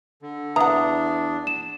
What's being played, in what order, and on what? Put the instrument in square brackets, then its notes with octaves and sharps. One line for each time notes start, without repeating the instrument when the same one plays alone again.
[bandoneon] D3
[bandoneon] E2 D4 [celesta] B4 E5 D#6 [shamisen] F#5 A#5
[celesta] E7